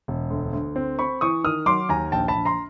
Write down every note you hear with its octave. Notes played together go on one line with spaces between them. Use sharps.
E1
D2
D2
C4
C4 B5 C#6
E3 C#6 D#6
D#3 D#6 F6
F#3 C6 D6
D#2 G#5 A#5
A#1 G5 A5
A5 B5
A#1
A#5 C6